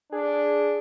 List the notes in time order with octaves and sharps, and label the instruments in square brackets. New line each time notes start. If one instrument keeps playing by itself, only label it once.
[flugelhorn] D4 [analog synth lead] G#4